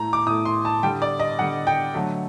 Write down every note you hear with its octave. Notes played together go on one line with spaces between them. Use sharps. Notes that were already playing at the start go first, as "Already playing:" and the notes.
Already playing: A2 A3 A#5
D6
A2 A3 D#6
C6
A5
D3 G3 G5
D5
D#5
D3 G3 F#5
G5
D3 F#3 A3